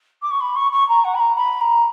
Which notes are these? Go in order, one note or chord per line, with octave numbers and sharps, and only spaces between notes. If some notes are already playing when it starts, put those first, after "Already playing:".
D6
C#6
B5
C#6
C#6
A#5
F#5
B5
A#5
B5
A#5